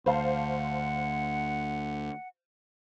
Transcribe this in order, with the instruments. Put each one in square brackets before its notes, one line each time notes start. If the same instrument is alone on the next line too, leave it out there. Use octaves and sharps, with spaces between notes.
[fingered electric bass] D2 [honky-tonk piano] C5 F5 A5 [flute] F#5